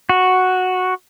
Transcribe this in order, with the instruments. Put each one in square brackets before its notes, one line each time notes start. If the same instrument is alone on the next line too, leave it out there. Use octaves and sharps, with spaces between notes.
[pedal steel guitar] F#4